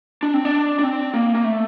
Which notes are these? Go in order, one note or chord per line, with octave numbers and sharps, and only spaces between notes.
D4
C4
D4
D4
C4
A#3
A#3
A3